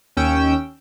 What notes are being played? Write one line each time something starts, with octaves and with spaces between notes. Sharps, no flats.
D#2 C#4 G5 E6